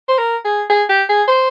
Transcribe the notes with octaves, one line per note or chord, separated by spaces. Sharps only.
C5
A#4
G#4
G#4
G4
G#4
C5